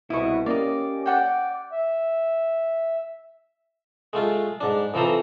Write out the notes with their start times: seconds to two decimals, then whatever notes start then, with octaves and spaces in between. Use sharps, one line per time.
0.10 C2 B2 E4 C#6 D#6
0.46 A#3 C#4 G4 D5 D#5
1.06 D5 F#5 G5
1.72 E5
4.13 G#3 A3 F4
4.61 G#2 D4
4.94 F2 E3 F3 A4 C5 A#5